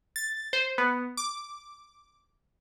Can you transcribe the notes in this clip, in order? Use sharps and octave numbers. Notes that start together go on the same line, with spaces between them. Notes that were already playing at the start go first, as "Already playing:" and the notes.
A6
C5
B3
D6